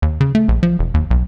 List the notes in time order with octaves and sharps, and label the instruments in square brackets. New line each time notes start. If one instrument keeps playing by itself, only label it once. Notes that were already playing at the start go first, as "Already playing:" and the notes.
[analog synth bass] D#2
C#3
A3
A#1
F3
E1
D#2
B1